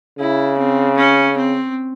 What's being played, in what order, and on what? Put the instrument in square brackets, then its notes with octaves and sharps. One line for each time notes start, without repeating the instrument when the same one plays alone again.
[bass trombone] C#3 [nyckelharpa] E4
[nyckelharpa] C4
C#4
C4